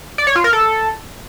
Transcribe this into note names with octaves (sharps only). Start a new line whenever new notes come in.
D5
C#5
F4
A#4
A4